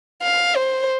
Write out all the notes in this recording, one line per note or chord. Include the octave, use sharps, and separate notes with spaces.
F5
C5